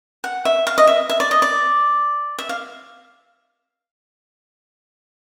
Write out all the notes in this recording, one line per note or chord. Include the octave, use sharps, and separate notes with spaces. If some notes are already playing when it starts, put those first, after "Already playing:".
F#5
E5
F5
D#5
E5
E5
D5
D#5
D5
E5
F5